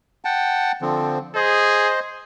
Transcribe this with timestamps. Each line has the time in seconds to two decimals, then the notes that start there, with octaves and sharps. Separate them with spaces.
0.25 F#5 G5 A5
0.82 D3 F3 C4
1.35 G#4 C5 D#5